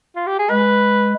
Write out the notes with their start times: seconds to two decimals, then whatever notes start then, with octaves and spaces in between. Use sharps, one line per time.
0.16 F4
0.26 G4
0.39 G#4
0.50 G#3 B4